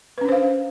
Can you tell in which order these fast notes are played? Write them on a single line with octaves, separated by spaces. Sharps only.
B4 C#4 D4 C5 F5